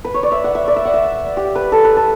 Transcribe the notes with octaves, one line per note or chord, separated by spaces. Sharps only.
B4
C#5
D5
E5
F#5
E5
D5
E5
F#5
E5
G4
B4
A4
B4
A4